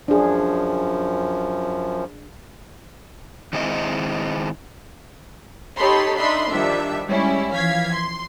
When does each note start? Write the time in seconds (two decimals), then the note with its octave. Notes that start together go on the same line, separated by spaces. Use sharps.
0.08 F#2 F3 D4 G#4
3.53 D#3 G#3 C4 D#4 E4 D#5
5.78 D#4 G4 A4 C#5 B5 C6
6.18 D4 D#4 E5 B5 C6
6.49 D#3 F3 G3 D4 E5
7.08 G3 G#3 C#4 E4
7.54 E3 F3 F5 G#6 B6
7.94 C6